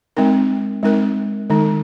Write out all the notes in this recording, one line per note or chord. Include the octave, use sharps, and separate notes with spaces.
G#3 C4 D#4 A#4
G#3 C4 D#4 A#4
D#3 G#3 D#4